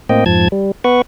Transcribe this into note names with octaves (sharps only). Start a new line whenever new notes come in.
A2 A#3 C4 D#5 G5
F2 G#2 F3 A5 G#6
G3
B3 B4 F#5 C#6